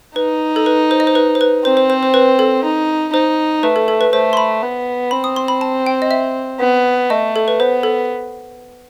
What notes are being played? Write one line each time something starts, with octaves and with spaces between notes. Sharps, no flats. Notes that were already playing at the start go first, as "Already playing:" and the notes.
D#4 B4
A4
B4
C5
D#5
C5
B4
C5
B4
C4 C5
C5
C5
C5
B4
A4
D#4
D#4 C5
A3 B4
A4
A4
B4
A3 C5
C6
B5
B3
C4 B5
D#6
C6
B5
A5
G5
D#5
E5
B3
A3 D#5
A4
B4
B3 C5
A4